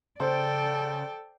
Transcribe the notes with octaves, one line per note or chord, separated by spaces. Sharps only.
C#3 A4 C5 D5 G5